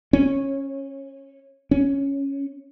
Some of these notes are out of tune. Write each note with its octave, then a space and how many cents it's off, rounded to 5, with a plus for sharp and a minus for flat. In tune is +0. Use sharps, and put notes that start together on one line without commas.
C#4 -15
C#4 +0